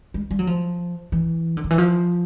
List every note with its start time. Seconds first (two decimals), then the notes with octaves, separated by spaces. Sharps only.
0.14 G#3
0.31 G3
0.39 F#3
0.47 F3
1.12 E3
1.57 D3
1.64 D#3
1.71 E3
1.78 F3